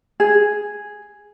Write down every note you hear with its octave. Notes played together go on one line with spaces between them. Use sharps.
G#4